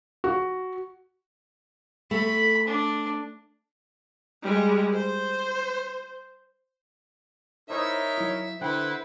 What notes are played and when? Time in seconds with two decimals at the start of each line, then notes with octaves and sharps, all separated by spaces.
0.24 F#4
2.11 A3 B5
2.67 D4
4.43 G3 G#3
4.94 C5
7.70 D#4 E4 A#4 C5 C#5 E5
8.18 F#3 E4
8.61 D3 E4 B4 C5 F#5 G5